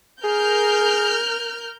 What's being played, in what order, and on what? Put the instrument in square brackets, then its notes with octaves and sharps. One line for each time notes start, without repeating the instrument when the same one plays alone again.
[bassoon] G#4 [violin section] A#4 F6 G6